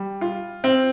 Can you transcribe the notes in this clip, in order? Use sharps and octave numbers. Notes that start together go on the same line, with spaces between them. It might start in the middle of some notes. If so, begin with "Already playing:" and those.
Already playing: G3
F4
C4